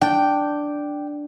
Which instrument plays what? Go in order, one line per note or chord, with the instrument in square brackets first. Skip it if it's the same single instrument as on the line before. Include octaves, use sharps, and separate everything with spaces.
[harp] D4 [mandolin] G5